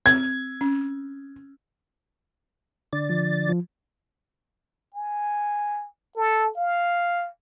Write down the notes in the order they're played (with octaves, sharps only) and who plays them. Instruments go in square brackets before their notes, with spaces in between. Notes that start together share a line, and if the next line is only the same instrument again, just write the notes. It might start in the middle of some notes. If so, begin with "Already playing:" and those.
[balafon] C4 [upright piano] G#6
[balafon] C#4
[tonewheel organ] D3 D5 A6
[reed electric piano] F3
F3
[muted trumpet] G#5
A4
F5